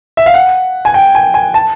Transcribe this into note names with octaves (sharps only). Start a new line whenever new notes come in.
E5
F5
F#5
G#5
G5
G#5
G#5
A5